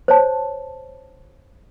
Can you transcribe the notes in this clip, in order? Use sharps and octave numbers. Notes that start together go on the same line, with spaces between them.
C5 C#5 A5